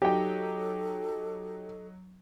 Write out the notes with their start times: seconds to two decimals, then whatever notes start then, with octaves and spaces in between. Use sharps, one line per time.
0.02 F#3 D#4 G4 A4 G5